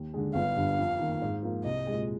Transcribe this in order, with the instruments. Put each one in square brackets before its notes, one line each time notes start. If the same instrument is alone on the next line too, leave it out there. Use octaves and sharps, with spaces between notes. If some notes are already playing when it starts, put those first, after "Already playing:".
Already playing: [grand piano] D#2
D3 G#3
[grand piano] G1 [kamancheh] F5
[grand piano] G2 D3
F2
D#3 A#3
G#2
F3 A#3
[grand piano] C2 [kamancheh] D#5
[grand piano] A#2 G#3